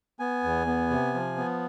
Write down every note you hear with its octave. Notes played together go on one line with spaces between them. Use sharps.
B3 G#5
E2
B3
C3
F3
B3